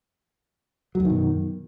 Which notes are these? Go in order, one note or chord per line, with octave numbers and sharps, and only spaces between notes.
F#2 B2 D#3 F#3